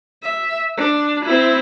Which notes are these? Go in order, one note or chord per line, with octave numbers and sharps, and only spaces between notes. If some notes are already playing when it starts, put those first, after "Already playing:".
E5
D4
C4 E4